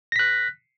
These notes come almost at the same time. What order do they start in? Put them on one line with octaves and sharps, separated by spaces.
A#6 B6 F#6